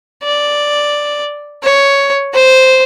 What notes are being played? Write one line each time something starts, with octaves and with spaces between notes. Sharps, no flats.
D5
C#5
C5